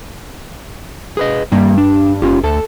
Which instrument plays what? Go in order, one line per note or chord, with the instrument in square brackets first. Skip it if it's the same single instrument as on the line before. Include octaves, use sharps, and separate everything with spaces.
[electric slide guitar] G#4 B4 D#5
[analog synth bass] G2 [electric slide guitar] G3 A#3
[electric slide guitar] D4
[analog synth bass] F#1 [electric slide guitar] C#4 F4 G4
[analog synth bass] D2 [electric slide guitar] A4 A5